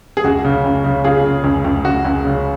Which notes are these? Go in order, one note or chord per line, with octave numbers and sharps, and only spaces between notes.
G#4
C#2 F#4
C#3
C#2
C#3
C#3 F4 G#4
C#3
C#2
C#2
C#2 F#4
C#2
C#3